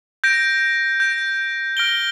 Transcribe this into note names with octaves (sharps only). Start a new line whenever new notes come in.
G6 A#6 D7
G6 A#6 D7
F6 A#6 D7 G7